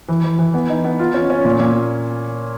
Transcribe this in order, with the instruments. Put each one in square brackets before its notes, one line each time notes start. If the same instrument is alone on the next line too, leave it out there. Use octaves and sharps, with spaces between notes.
[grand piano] E3
E3
E3
B3
D#4
B3
F4
C#4
C#4
A#2
A#2